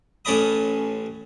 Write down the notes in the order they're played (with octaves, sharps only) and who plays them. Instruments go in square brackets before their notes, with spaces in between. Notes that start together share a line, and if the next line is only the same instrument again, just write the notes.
[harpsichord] A1 C#4 A4 D5 B5 D#6